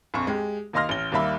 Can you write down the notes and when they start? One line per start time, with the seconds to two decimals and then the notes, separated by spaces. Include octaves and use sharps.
0.14 A#1 F2 C#6
0.27 G#3 G4
0.73 D#2 A#3 D#5 C6 F6 A#6
0.89 A1 G7
1.12 D#2 G3 A#3 E5 B5